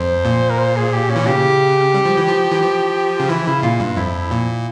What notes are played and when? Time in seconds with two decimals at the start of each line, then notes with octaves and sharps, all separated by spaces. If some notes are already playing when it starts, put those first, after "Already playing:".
Already playing: F2 C5
0.25 A#2
0.50 A#4
0.59 C5
0.76 G#4
0.93 G4
1.10 C#4
1.16 E3
1.27 C#3 G4
1.94 G3
2.05 F3
2.17 E3
2.29 F3
2.51 E3
2.62 F3
3.20 C#3
3.29 E3 E4
3.46 C#3 E4
3.63 A#2 F4
3.80 G2
3.97 F2 E4
4.31 A#2